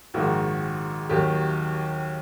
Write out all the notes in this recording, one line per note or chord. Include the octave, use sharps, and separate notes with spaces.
A#1 G#2 D#3 F#4
D#2 D#3 F#3 G4